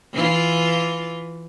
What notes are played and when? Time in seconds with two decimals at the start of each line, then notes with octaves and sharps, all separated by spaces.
0.13 E3 F4